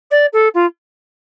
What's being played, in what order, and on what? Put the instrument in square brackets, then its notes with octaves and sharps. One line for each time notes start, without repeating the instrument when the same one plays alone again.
[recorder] D5
A4
F4